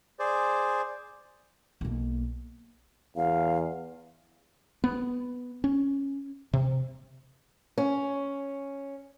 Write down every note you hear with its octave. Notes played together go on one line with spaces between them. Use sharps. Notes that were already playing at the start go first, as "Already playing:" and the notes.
G#4 C5 D5
B1 A#3
E2 F5
B3
C#4
C3
C#4